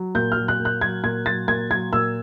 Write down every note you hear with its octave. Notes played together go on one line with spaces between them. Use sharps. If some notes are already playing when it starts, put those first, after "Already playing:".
Already playing: F#3
A#2 G6
F6
F#3
F#6
A#2
F#6
F#3 G#6
A#2 G#6
F#3 A6
A#2 G#6
F#3 G#6
A#2 E6